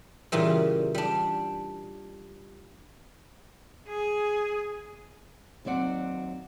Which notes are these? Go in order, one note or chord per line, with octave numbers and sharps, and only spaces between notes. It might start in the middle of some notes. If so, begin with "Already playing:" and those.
A#2 C#3 E3 G3
G3 D4
G#4
D#2 F#3 C4 D5 F#5